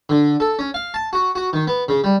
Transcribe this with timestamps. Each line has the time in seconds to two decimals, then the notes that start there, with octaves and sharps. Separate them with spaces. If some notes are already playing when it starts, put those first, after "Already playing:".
0.09 D3
0.40 A4
0.59 C#4
0.74 F5
0.94 A5
1.13 F#4
1.35 F#4
1.53 D#3
1.67 B3
1.88 C#3
2.04 G3